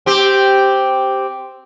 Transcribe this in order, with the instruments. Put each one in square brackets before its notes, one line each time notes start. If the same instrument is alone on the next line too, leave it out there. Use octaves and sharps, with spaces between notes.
[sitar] C4 G4